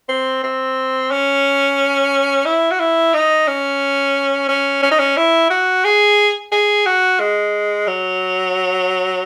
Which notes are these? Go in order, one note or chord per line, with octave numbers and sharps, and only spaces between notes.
C4
C4
C#4
E4
F#4
E4
D#4
C#4
C#4
C#4
D#4
C#4
E4
F#4
G#4
G#4
F#4
G#3
F#3